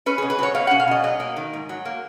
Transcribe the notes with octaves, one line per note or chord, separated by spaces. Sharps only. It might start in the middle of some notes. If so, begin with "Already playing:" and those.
C#4 B4
G#4
B2
B4
F#3 C#5
B2 F5
F#5
C#4
F5
B2 D#5
F#3 D#5
A#3
D#3
G#2
F#3
A#3